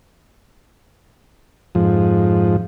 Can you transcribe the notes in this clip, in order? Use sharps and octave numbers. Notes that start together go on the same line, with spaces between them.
F2 G#2 F3